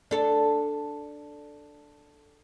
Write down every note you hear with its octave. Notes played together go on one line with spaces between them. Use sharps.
D4 A4